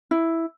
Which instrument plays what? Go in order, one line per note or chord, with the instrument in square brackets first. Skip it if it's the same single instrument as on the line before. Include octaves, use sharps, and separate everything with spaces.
[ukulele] E4